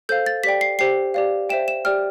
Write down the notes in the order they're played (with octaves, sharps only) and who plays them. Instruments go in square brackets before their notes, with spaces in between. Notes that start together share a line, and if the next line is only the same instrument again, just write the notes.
[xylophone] A4 C5 F5 G6
A6
G4 D5 G5 B6
C7
G4 C5 G5 C7
G4 D5 F5
C5 E5 G5 E7
E7
G4 D5 G5 F6